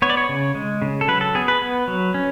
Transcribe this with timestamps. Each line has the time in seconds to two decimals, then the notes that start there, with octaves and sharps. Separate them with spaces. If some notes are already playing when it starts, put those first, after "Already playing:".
0.02 B3 C#5
0.10 D5
0.17 C#5
0.29 C#3
0.55 G#3
0.82 C#3
1.01 A4
1.08 F#3 B4
1.21 A4
1.35 B3 G#4
1.48 B4
1.62 B3
1.88 F#3
2.14 C#4